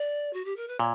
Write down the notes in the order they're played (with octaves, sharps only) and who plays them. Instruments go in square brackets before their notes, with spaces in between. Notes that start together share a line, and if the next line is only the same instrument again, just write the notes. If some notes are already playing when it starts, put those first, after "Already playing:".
Already playing: [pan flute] D5
F#4
G4
A#4
B4
[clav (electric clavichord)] A#2 [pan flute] C#5